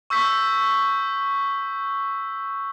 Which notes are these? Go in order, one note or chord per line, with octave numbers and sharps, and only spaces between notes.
C#6 E6 G6 B6